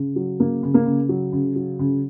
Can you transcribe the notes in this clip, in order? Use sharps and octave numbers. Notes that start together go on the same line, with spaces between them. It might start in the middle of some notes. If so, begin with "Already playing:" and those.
Already playing: C#3
F#3
C#3 A#3
C#3
A#3
C#3
F#3
C#3
F#3
C#3